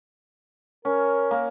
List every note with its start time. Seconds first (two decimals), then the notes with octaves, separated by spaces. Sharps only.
0.85 C#4 A#4
1.31 A#3